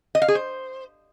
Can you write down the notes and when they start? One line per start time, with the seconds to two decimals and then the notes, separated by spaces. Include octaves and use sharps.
0.15 D#5
0.22 F5
0.28 G#4
0.35 C5